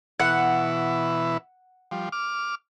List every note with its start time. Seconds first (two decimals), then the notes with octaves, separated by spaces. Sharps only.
0.20 B2 E3 E4 F#5
1.91 F3 G3
2.12 D6 F6